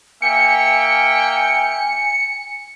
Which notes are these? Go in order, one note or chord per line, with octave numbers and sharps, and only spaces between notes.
A#3 E5 G5 G#5 C#7